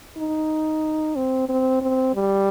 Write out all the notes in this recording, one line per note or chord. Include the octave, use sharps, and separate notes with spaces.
D#4
C4
C4
C4
G3